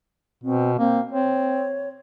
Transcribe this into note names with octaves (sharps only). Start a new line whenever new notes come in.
B2 C4
A#3 C4
C4 C#5